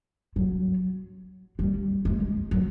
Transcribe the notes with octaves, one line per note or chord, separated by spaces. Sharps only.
F#3
G3
G#3
F#3